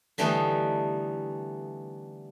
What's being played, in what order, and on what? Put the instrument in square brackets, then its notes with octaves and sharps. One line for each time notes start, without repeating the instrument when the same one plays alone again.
[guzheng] D3 E3 G3 A3 B3 D#4